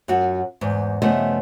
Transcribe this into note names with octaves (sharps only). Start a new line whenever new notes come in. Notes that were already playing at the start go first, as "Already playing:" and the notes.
F#2 F4 F#4
E2 G#2
G2 C#3 F3 A3 B3 D#5